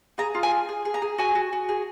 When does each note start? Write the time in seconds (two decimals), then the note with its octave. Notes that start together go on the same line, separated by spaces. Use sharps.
0.18 G#4 A#5
0.35 F4
0.43 G#5
0.51 G#4
0.69 G#4
0.85 G#4
0.94 A#5
1.02 G#4
1.18 F#4 G#5
1.35 F#4
1.53 F#4
1.69 G#4